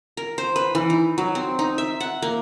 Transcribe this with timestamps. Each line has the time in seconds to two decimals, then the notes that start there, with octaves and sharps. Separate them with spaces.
0.17 A#4
0.38 C5
0.56 B4
0.75 E3
0.90 D#4
1.18 F#3
1.35 C4
1.59 D#4
1.78 E5
2.00 F#5
2.22 A#3